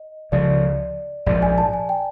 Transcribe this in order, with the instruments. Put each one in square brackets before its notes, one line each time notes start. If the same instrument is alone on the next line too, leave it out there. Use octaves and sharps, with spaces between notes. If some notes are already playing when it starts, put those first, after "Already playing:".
Already playing: [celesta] D#5
[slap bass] C#2 C#3 F3 [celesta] D5
[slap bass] A#1 G#2 F3 [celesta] D5
[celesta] G#5
A5
G#5
G5